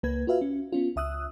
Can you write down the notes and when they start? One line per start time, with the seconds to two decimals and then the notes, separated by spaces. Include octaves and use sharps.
0.03 C#2 A#3 B4 G#6
0.27 F4 F#4 B4 E5 F5
0.41 C#4
0.73 B3 C#4 F4
0.96 C#2 E5 D#6 E6 F#6